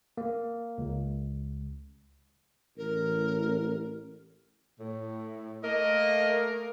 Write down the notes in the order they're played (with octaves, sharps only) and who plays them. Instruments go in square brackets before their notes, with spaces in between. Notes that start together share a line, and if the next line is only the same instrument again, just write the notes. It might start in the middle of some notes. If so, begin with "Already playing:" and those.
[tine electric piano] A#3
C#2
[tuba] A1 [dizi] A#4
[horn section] A2
[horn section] A3 A#3 A#4 [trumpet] D#5